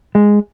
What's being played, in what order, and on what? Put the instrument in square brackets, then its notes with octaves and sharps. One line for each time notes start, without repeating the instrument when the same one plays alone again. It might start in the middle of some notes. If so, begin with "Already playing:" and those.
[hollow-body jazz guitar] G#3